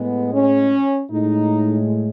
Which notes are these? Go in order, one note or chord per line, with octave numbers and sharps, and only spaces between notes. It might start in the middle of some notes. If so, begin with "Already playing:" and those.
Already playing: A2 G#3 B3
C#4
A2 G#3 D#4